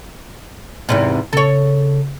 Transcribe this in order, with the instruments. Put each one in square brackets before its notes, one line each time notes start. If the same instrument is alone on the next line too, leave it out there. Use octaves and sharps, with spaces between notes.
[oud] E2 G#2 C3
[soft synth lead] C#3 [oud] A4 C#5